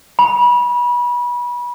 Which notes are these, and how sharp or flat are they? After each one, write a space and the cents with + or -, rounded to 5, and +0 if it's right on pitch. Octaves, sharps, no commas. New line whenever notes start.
B5 -30